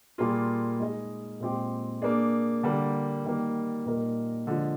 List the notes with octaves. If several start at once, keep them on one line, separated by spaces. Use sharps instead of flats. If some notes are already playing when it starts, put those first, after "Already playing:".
A#2 G3 A#3 F4 G#4
G#3 D#4 G#4 D#5
A#2 G#3 C4 G4
A#3 D4 G#4
D3 G3 A#3
D#3 G3 A#3
A#2 G3 A#3 D#4 A#4
D3 F3 G#3